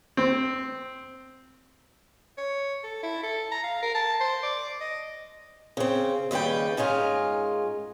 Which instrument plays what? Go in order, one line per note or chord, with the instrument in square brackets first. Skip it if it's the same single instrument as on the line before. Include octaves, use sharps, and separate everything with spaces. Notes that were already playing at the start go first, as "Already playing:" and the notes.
[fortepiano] C4
[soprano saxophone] C#5
A4
E4
A4
A#5
F5
A#4
A5
C5
D5
D#5
[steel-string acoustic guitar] C#3 C4
D#2 C#3 G3 B4 G5
G#2 G#3 C#4 F4 A#4